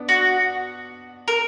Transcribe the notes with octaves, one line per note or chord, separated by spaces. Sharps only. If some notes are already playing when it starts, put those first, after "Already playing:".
Already playing: B3 D4
F#4
A#4